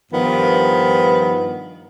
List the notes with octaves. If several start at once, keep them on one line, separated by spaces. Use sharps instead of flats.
G2 D#3 F3 B3